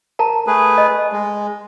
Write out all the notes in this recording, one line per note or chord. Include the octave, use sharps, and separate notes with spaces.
A#4 A5 A#5
A3 G#4 B4
D#5
G#3